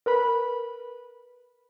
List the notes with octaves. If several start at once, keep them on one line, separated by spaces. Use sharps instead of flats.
A#4 B4 B5